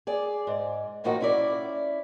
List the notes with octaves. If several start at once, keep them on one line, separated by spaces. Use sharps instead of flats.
G#4 D5
G#2
A2 D#3 F3 A#3 D#4 F#4
C#4 E4 D5